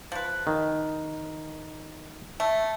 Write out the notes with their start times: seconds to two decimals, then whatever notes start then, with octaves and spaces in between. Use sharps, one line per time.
0.12 F3 B4
0.47 D#3
2.40 A3